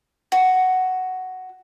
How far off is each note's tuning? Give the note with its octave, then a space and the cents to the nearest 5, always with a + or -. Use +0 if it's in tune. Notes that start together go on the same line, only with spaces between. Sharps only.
F#4 +5